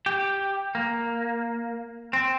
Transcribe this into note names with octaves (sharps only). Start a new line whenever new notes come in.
G4
A#3
C4